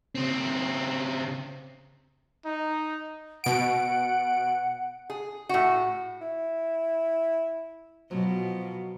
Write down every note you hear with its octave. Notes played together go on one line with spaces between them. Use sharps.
C#3 C4
D#4
B2 F#5 D7
G#4
A2 F#4
E4
B2 F3 F#3